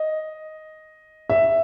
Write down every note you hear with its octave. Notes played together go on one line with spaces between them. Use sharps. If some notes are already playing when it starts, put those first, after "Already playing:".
Already playing: D#5
E5